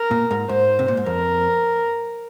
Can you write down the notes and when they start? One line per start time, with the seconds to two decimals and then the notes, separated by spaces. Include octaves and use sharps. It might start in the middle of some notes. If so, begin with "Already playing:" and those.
Already playing: A#4
0.11 A#2
0.31 G#2
0.49 G#2 C5
0.79 C3
0.88 A#2
0.97 G#2
1.06 F2 A#4